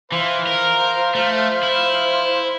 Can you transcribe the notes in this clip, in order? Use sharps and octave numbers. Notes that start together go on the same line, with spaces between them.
E3 C5 F5
A#4
A3
E4